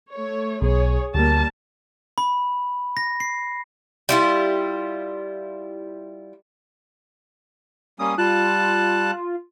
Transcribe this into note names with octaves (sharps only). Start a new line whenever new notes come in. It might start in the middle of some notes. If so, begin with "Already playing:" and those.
A3 C#5
B1 G#4 C#5
D2 G3 A#3 A5
B5
A#6
C7
G3 E4 F4
G3 A#3 C#4 D#6
G3 F4 A5 F#6